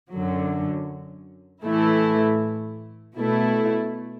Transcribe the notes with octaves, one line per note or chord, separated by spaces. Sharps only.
F#2 D3 F#3
A2 E3 A3 E4
B2 A3 E4